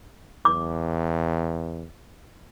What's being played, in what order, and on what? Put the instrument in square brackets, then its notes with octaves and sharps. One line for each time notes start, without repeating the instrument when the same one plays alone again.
[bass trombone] E2 [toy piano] D6